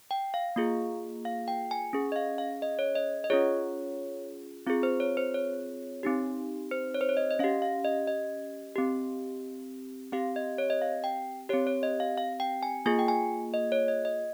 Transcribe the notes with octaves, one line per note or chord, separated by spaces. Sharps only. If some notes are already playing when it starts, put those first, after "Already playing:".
G5
F5
A#3 F4 G#4
F5
G5
G#5
C#4 G#4
D#5
F5
F5
D#5
C#5
D#5
D#5
C#4 F4 G#4 C#5
C4 F4 G#4
C5
C#5
C5
C#5
C4 D#4 G4
C5
C#5
C5
C#5
D#5
D#5
C#4 G4 F5
F5
D#5
D#5
C4 G4
C4 G4 F5
D#5
C#5
D#5
F5
G5
C4 G4 C#5
C#5
D#5
F5
F5
G5
G#5
A#3 F4 G#4 G#5
G5
G#5
D#5
C#5
D#5
D#5